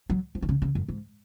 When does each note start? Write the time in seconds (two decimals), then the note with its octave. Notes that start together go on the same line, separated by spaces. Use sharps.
0.10 F#3
0.35 F3
0.42 D#3
0.49 C#3
0.62 C#3
0.75 F#2
0.88 G#2